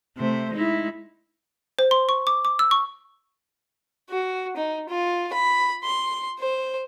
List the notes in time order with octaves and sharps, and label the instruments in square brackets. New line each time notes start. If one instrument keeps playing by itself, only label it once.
[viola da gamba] C3 A3 C5
G#3 D#4 E4
[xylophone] C5
C6
C#6
D6
D6
E6
C#6
[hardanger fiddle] F#4
D#4
F4
B5
C6
C5